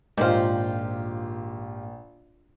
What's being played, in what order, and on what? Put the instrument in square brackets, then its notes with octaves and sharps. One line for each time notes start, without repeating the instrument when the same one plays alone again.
[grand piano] A#1 [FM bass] G#2 [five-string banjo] D#3 C5 [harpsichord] F4 G4